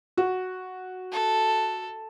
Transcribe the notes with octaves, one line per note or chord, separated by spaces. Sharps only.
F#4
A4